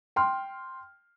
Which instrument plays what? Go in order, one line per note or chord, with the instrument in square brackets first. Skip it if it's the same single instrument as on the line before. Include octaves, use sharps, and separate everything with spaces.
[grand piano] G5 C6 F6